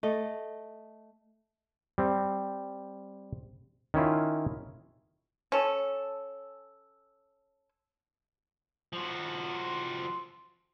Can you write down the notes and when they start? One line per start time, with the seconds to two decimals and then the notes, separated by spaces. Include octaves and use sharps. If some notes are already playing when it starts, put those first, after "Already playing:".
0.03 A3 D#5
1.98 G3 C4
3.94 D#3 C#4 E4 F4
5.52 C#4 A4
8.93 F3 F#4